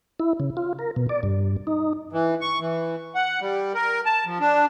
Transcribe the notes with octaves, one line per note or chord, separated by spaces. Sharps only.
E4
C#3
F4
A#4
B2
D5
G2
D#4
E3
C#6
E3
F#5
G3
A#4
A5
F3
D4